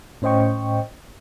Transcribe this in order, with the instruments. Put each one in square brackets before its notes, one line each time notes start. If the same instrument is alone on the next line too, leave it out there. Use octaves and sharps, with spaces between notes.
[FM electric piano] A2 C#4 C5 D#5 G5 C#6